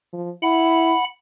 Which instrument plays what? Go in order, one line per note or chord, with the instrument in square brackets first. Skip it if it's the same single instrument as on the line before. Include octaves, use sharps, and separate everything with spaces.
[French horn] F3
[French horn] E4 [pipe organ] F#5 B5